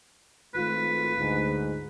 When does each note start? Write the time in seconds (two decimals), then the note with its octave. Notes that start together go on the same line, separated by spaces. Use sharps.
0.55 G#1 A3 F4 B4
1.18 D2 G#2